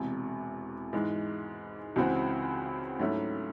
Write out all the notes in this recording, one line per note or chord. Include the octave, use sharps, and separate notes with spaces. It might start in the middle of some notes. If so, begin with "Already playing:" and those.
Already playing: E1 E2 C3
G#2 E3 G#3
C#2 C#3 E3 C4 F#4
G#2 F#3 A3 C#4 E4